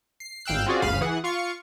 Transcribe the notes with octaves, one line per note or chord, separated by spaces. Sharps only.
C7
G#1 F5 G5 E6 F#6
C4 C#4 F4 F#4 G#4 D5
G1 D2 C#3 F5 B5 D#7
E3 G#4 F#5
F4 F5 C#6 C#7